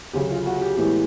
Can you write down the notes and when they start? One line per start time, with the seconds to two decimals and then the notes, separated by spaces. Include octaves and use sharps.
0.13 D2 C#3 F#3 G4
0.30 F4
0.46 F#4
0.62 G4
0.77 A2 E3 G#3 B3 G4